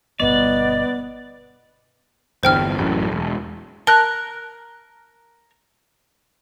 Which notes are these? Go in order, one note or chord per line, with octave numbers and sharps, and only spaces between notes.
G1 B2 B3 D5 D#5
G1 E2 G2 C5 G5 F6
A1 F#2 A2
E1
A#4 A5 F#6